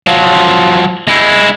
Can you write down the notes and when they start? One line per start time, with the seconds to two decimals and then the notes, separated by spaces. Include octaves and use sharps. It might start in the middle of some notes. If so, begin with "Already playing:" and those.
0.07 F3 F#3
1.08 G#3 E4